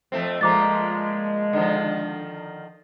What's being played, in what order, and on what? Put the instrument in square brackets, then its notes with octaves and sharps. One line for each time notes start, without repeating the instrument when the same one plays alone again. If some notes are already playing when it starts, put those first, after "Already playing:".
[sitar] F2 A3 C4
[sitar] A#2 F3 A3 [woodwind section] G#3 [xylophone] A#5 D6 A6
[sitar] D3 D#3 F3